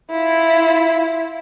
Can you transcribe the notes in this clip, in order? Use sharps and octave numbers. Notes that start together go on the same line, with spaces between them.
E4 F4